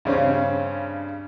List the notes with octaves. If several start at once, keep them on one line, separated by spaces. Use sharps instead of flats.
G2 C#3 C4 C#4